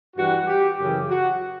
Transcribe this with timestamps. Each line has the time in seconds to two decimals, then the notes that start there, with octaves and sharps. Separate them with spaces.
0.16 G2 E3 G3 F#4
0.47 G4
0.78 F#2 C#3 E3 G4
1.09 F#4